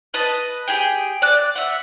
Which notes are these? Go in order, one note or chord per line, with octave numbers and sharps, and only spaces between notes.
B4 D#5 A5
G4 G#4 G5
D5 D6 F#6
E5 F#5